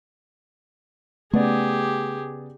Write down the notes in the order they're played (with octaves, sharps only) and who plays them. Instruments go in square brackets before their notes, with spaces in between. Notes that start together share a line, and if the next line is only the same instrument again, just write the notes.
[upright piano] C#3 B3 D5 [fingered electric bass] A3 [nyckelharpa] G4 G#4